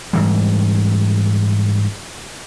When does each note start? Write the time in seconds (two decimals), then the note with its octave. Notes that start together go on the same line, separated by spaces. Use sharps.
0.13 G#2 E3 G3